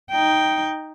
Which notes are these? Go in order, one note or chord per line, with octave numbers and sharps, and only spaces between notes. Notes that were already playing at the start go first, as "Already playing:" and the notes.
D#4 G5